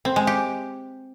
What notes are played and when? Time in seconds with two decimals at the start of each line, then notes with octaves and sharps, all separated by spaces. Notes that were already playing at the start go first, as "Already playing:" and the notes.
0.05 C4
0.16 G#3
0.27 G4